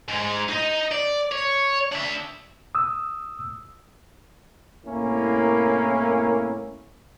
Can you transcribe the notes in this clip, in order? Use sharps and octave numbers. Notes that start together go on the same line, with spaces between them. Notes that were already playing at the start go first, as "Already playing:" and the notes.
G#2 G#3
D#4 D#5
D5
C#5
D4 E5
D#6 E6
C2 A2 A#3 C#4 E4 A#4